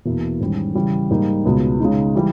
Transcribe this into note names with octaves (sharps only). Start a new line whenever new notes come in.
E2 B2 A#3 E4
G#2 D#3 G3 C#4
C#3 E3 G3
G#2 G3 A#3 D#4
C#2 B2 G#3 B3
C#3 G#3 D#4
E3 G3